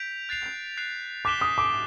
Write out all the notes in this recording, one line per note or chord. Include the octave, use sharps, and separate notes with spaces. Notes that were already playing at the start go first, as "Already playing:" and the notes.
Already playing: G6 B6 D7 F7
F#6 A6 C7 F7
F#6 A6 C7 F7
D6 F#6 B6 E7 G7
D#6
D6